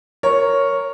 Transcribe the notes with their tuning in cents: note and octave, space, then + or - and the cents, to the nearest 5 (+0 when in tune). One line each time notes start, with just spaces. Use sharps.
A#4 +0 C#5 +0